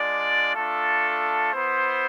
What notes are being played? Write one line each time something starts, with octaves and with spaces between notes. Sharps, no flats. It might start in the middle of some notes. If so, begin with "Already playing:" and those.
Already playing: G#3 D4 F4 D5
A3 D4 F4 A4
B3 E4 C5